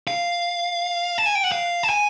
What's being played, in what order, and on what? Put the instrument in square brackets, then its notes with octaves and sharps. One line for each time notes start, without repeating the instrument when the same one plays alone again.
[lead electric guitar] F5
A5
G#5
G5
F#5
F5
A5
G#5